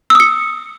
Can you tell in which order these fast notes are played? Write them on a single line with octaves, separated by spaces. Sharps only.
E6 D#6 C#7